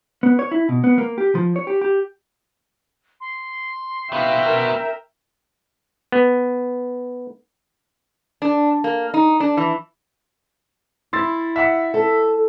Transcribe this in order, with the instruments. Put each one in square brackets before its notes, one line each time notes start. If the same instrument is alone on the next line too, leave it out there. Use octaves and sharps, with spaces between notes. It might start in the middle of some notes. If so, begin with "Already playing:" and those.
[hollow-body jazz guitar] B3
C#5
E4
B2
B3
A#3
G4
F3
C#5
G4
G4
[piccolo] C6
[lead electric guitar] B3 F#4 [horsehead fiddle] E5 G5 [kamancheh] F5
[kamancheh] A#4
[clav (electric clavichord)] B3
[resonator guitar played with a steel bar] D4
A#3
D#4
D4
E3
[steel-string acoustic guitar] E4 [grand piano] C6 E6 A6
[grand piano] E5 F#5 E6
[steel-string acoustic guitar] A4